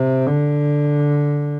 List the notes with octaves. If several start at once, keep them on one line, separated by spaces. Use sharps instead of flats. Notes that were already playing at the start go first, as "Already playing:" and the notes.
Already playing: C3
D3